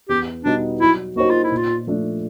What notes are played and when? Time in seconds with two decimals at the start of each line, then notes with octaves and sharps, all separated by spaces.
0.09 E2 G4
0.44 B2 G3 B3 D4 D#4
0.80 F#3 E4
1.16 A#3 D#4 F#4 G4 C5
1.30 F4
1.43 E4
1.52 A#2 F4
1.87 F3 A3 D4